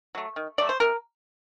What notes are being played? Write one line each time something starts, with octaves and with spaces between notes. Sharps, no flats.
F#3 A3
D#3
F#3 A3 D5
C5
C3 A#4